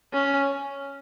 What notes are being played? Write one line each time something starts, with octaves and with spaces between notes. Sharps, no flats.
C#4